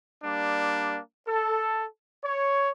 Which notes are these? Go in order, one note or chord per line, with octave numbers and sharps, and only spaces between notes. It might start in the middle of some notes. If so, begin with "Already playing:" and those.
G3 A#3 D4
A4
C#5